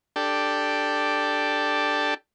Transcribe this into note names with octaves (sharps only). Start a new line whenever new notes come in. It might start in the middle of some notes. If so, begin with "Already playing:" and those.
D4 G4 A4